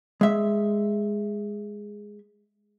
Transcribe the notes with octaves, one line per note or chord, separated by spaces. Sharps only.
G#3 E5